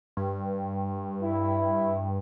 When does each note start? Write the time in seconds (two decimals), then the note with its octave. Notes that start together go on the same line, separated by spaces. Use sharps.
0.17 G2
1.21 E4